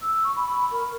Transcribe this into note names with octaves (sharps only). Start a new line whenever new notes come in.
E6
C#6
B5
A#4